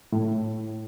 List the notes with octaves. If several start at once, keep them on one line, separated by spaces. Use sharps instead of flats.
A2